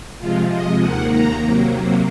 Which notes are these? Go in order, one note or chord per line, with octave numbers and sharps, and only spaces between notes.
C3 F3 G#3 F4
D#5
D#2 D#3 A#3 F#5
A#5
C3 F#3 A#3